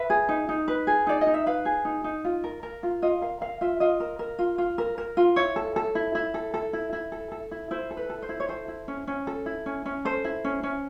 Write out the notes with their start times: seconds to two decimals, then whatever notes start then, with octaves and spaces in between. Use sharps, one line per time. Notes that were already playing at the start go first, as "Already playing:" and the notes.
Already playing: B4 E5
0.10 G#4
0.29 D#4
0.49 D#4
0.68 B4
0.87 G#4
1.07 D#4 D5
1.21 D#5
1.27 D#4
1.34 E5
1.46 B4 F5
1.65 G#4
1.85 D#4
2.04 D#4
2.25 F4
2.44 A#4
2.63 A#4
2.83 F4
3.02 F4 D#5
3.22 A#4 F5
3.41 A#4 F5
3.61 F4 E5
3.80 F4 D#5
4.00 A#4
4.19 A#4
4.39 F4
4.58 F4
4.78 A#4
4.98 A#4
5.17 F4
5.36 E4 C#5
5.56 A4
5.76 A4
5.95 E4
6.15 E4
6.34 A4
6.54 A4
6.73 E4
6.93 E4
7.12 A4
7.32 A4
7.51 E4
7.71 E4 C5
7.91 A4
7.97 B4
8.10 A4
8.22 C5
8.29 E4
8.40 C#5
8.49 A4 C5
8.68 E4
8.88 C#4
9.07 C#4
9.27 A4
9.46 E4
9.66 C#4
9.86 C#4
10.05 A4 C5
10.24 E4
10.44 C#4
10.63 C#4